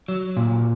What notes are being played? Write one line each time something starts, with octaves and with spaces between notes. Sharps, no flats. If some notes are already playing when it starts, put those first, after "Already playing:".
F#3
A#2